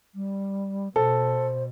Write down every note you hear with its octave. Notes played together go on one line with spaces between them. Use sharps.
G3
B2 A4 C5